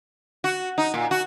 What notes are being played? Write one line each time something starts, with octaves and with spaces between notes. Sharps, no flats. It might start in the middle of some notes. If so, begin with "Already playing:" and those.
F#4
D#4
A#2
F#4